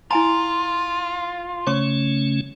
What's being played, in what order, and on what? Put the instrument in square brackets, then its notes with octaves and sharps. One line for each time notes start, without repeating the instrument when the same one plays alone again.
[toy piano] E4 G#5 A#5 [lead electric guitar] F4
[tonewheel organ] C#3 A3 C#4 [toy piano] C#5 C#6